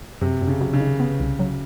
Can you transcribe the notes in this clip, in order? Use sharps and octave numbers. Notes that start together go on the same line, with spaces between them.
F#2 C3
F#2
C#3
F#3
C#3
D#3
B3
C2
F#3